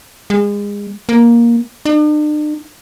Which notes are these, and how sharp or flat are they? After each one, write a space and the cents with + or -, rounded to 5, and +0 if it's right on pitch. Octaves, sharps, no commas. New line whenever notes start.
G#3 -30
A#3 +10
D4 +45